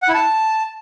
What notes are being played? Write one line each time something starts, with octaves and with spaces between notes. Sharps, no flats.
F#5
E4
A5